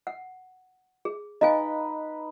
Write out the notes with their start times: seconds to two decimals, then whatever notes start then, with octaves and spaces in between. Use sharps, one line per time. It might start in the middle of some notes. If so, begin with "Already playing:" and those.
0.07 F#5
1.05 G#4
1.41 D#4 B4 D#5 F5 G#5